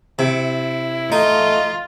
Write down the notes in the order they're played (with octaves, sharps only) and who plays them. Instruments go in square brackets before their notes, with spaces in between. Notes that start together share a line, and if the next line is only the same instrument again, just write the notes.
[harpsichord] C3 [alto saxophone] E4
[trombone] A3 [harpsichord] D#4 [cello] F4 [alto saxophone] D#5